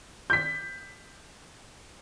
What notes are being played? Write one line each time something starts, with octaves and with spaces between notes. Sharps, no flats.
G6 B6